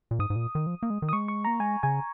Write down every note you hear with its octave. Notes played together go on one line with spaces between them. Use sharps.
A#2
G#2 D#6
G#2
A#2
D#3
F3
A#3
G#3
D#3
D#6
G#3 C#6
C#6
A#3 A#5
G#3 G#5
C#3 G#5